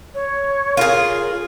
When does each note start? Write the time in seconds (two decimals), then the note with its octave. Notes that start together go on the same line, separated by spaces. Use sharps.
0.14 C#5
0.77 F4 G#4 A#4